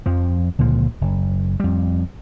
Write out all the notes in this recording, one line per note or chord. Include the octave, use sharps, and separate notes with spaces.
F2 F3
C#2 A#2 D3 F3
F#1
F2 G3